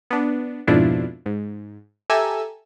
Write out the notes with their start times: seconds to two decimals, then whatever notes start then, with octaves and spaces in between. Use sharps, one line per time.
0.11 B3 D4
0.67 F2 G#2 B2 D4 E4 F4
1.26 G#2
2.10 G4 A4 E5 G#5 A#5 E6